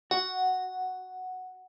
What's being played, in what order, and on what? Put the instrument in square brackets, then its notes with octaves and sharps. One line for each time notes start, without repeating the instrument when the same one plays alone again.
[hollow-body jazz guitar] F#4 [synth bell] F#5